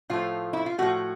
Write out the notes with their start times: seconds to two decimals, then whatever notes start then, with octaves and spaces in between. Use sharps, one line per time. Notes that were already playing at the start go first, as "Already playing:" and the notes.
0.10 A2 F3 A3 F4
0.53 E4
0.66 F4
0.78 A2 F3 A3 F#4